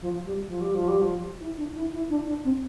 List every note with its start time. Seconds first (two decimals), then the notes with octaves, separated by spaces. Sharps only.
0.01 F3
0.25 G3
0.47 F3
0.61 G3
0.74 F3
0.88 G3
1.01 F3
1.40 E4
1.57 D4
1.75 E4
1.93 E4
2.10 D4
2.27 D4
2.44 C4